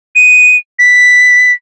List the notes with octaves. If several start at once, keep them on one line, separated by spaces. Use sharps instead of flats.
D#7
B6